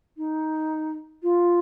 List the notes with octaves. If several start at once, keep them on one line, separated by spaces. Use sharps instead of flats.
D#4
F4